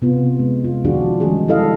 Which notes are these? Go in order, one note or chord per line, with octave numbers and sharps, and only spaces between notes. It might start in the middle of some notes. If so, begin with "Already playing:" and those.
C3 B3 F4
G#3
F4
D#3 F3 D4 F4 F#4 G#4
D#3 E3 G3 G#3 C#4 G#4
D4 E4 G4 A4 D#5 F5